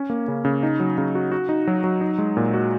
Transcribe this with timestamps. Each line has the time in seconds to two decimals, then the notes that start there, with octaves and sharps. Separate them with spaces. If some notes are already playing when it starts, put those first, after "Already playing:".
Already playing: C#4
0.10 A#3
0.28 C#3
0.45 C#3
0.63 D#4
0.80 F#3
0.98 C#3
1.15 F#4
1.31 F#4
1.49 D#4
1.67 F#3
1.84 F#3
2.01 D#4
2.18 G#3
2.37 A#2
2.53 F#4